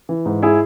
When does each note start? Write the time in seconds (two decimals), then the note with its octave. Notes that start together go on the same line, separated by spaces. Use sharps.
0.09 E3
0.26 G#2
0.42 E4 G#4